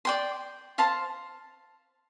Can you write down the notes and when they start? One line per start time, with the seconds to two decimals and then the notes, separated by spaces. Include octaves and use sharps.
0.05 D5 G5 C6
0.78 C5 F5 A5 C6